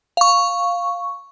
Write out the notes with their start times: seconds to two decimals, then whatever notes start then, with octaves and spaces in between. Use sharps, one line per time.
0.17 F5 C#6